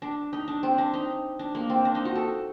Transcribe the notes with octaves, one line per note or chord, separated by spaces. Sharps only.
D4
D#4
D4
C4
D4
D#4
D4
A#3
C4
D4
D#4
F#4
A4